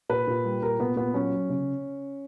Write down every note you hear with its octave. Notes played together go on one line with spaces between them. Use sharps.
A#2 B4
A#2
G3
A#2 A#4
A#2 B3
A#2 B3
F#3 C#4
F#3
C#3